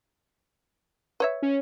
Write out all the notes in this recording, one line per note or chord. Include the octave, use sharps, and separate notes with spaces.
B4 C#5 E5
C#4